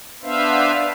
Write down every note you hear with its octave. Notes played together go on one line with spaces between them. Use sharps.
B3 D4 B4 C5 E5 F5